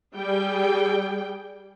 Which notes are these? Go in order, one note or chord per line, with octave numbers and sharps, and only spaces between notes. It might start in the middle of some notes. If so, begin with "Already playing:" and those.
G3 G#4 G5